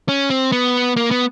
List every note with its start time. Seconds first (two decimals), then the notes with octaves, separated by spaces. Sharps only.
0.09 C#4
0.30 C4
0.52 B3
0.97 A#3
1.11 B3